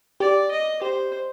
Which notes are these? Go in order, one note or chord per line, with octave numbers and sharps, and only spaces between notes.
G4 D5
D#5
G4 C5